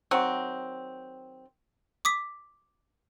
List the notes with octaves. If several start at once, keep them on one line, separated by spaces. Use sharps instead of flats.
D#3 F#3 C4
D6 D#6 B6